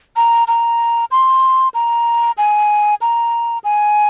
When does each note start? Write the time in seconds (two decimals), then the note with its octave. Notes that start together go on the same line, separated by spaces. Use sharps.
0.16 A#5
0.48 A#5
1.11 C6
1.74 A#5
2.38 G#5
3.02 A#5
3.64 G#5